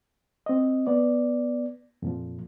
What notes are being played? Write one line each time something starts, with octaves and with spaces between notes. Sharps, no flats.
C4 D#5
B3 D5
F2 A#2 F3